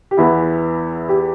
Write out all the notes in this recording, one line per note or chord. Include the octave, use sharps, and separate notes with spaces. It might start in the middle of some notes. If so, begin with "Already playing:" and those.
G4
E2 E3 B3 E4
G4